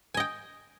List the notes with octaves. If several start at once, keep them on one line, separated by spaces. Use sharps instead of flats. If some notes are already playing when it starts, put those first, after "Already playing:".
D#5 G5 G#5